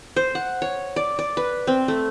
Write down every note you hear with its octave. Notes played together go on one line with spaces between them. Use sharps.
C5
F#5
C#5
D5
D5
B4
C4
A3